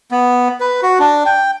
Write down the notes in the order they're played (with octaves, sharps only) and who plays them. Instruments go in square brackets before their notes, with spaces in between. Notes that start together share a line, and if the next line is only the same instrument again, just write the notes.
[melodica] B3
B4
F#4
D4
G5